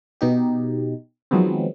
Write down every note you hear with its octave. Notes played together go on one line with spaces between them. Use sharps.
B2 D#4 G4
D#3 F3 F#3 G#3 B3 C4